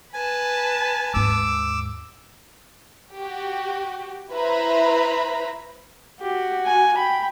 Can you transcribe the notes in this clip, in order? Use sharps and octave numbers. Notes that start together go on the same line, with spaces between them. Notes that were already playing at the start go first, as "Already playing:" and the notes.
B4 G#5 A5
D#2 G#2 D6 E6
F#4 G4
E4 B4 C5 E5 A#5 B5
F#4 G4
G#5
G5 B5